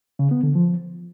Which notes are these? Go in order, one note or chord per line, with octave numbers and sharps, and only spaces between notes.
C#3
B3
D3
F3